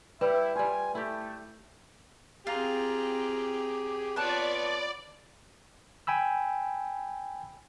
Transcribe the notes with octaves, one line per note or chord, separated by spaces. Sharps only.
G3 E4 G4 B4 E5
G3 F4 G#5
A3 E4 G4
C4 F4 G4 G#4 A#5
B3 F4 B4 C#5 D5 A5 F#6
G5 G#5 B5 E6